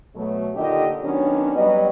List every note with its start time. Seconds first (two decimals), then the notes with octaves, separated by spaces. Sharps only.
0.15 B2 F#3 A3
0.55 A#2 D3 D#3 D4 G4 D#5
1.03 D#3 F#3 B3 C#4 D4
1.56 F#3 G3 B3 B4 D#5